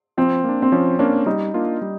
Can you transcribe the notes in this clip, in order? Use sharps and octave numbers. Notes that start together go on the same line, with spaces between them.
F3 C4
A#3 D4
C4
F3 C#4
A#3 C#4 D4
G3 D#4
A#3 D4 F4
G3